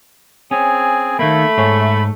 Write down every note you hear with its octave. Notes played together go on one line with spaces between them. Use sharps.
C4 C#4 G#4 G#5
D#3 A3 A#3 B5
G#2 G#4 C#5